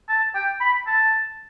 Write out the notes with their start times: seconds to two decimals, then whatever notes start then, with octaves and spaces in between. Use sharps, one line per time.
0.09 A5
0.35 G5
0.61 B5
0.87 A5